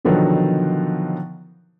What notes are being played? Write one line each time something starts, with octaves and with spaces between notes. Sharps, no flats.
B2 D3 D#3 F3 F#3 B3